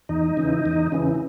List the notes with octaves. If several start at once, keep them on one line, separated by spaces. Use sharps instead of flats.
E2 D#4
C#3 E3
E2
C#3 E3